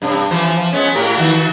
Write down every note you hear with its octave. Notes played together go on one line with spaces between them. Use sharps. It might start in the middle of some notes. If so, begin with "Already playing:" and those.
G2 C3
E3 F3 C5
F3
G#3 B3 C#4
A2 G4 A#4
D#3 F#4